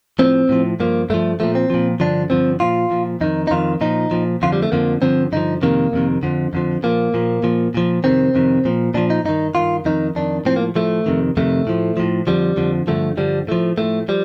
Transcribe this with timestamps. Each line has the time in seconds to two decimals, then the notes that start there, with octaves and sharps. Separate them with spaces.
0.19 A2 F3 C4
0.49 A2 F3
0.80 G2 F3 A#3
1.10 G2 F3 A3
1.40 A#2 F3 A3
1.55 C4
1.70 A#2 F3
2.00 G2 D3 F3 D4
2.30 G2 D3 F3 C4
2.60 A#2 F3 F4
2.91 A#2 F3
3.21 F2 D#3 D#4
3.47 D#4
3.51 F2 D#3 F4
3.81 A#2 F3 D#4
4.11 A#2 F3
4.42 F2 D3 F3 F4
4.53 G3
4.63 A3
4.72 F2 D3 F3 A#3
5.02 G2 D3 F3 C4
5.32 G2 D3 F3 D#4
5.62 F2 C3 D#3 A#3
5.93 F2 C3 D#3
6.23 F2 D3 F3
6.53 F2 D3 F3
6.83 A#2 F3 A#3
7.14 A#2 F3
7.43 A#2 F3
7.74 A#2 F3
8.04 F2 C3 D#3 C4
8.35 F2 C3 D#3
8.65 A#2 F3
8.94 A#2 F3 D4
9.10 D#4
9.25 G2 D#3 D#4
9.55 G2 D#3 F4
9.85 F2 D#3 D#4
10.15 F2 D#3 D4
10.45 A2 F3 C4
10.56 A#3
10.76 A2 F3 A3
11.06 F2 C3 D#3
11.37 F2 C3 D#3 A3
11.67 A2 F3
11.97 A2 F3
12.27 F2 D3 F3 G3
12.57 F2 D3 F3
12.87 G2 D3 F3 A3
13.17 G2 D3 F3 G3
13.47 A2 F3 A3
13.78 A2 F3 A3
14.08 F3 G3